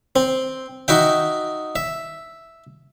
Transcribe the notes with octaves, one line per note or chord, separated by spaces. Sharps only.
C4
D#4 F#4 E5 G5
E5